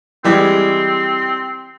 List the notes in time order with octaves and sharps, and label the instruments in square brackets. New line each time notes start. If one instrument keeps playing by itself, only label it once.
[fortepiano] E3 G3 G#3 [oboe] C4